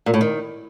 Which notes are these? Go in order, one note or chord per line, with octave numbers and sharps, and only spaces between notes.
A#2
A2
D#3